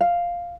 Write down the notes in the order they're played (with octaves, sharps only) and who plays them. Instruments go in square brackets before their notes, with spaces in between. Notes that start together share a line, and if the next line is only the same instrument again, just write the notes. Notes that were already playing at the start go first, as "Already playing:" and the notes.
[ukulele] F5